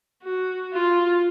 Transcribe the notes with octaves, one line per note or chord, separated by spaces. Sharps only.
F#4
F4